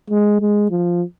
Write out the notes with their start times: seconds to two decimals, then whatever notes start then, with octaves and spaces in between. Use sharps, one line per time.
0.10 G#3
0.41 G#3
0.71 F3